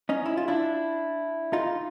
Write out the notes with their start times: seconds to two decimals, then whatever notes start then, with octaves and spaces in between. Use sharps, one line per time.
0.09 C#4 D#4
0.26 E4
0.37 F4
0.48 D4 E4
1.53 D#4 F4